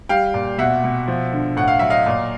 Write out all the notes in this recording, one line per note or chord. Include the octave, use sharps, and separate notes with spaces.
G3 F5 G5
A#2
B2 E5 F#5
B2
F3
D3
A2 F#5
F5
F#3 E5
D#5 F5
A#2